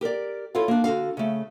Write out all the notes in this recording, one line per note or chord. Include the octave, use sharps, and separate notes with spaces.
G4 A#4 C5 D5
E4 F4 A4 C#5 F5
A#3 D4
D3 F#4 A4 F5
C#3 A3